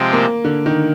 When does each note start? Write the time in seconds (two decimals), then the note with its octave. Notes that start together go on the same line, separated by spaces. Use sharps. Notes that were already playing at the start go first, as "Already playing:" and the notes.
Already playing: C3 F3 G#3 C4 G4
0.13 A#3
0.45 D3
0.66 D#3